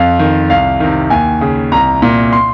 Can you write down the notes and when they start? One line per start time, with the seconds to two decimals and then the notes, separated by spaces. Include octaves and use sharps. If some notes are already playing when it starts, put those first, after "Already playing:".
Already playing: F2 F5
0.19 D#3
0.50 C2 F5
0.80 C3 D#3
1.10 D#2 G#5
1.41 C#3
1.72 C2 A#5
2.02 A#2
2.32 C6